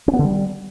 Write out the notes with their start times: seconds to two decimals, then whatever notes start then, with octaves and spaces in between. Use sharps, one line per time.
0.08 C#4
0.13 B3
0.19 D3
0.25 G3